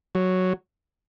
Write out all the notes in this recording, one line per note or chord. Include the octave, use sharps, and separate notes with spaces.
F#3